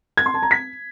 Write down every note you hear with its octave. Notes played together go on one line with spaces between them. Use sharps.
G#6
C6
A5
A#5
B6